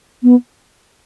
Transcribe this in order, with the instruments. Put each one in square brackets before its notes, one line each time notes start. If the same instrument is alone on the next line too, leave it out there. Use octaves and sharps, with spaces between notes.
[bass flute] B3